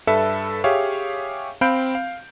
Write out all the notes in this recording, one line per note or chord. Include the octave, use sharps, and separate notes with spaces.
G2 A4 B4 E5 A5 C#7
G4 G#4 C#5 E5 F5
C4 F5 B5 G6 D7
F5